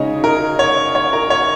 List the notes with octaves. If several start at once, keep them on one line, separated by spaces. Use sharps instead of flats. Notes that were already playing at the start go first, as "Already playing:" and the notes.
Already playing: C#3 G#3 D#4 C#5 D#5
A#4
C#5
C#5
A#4
C#5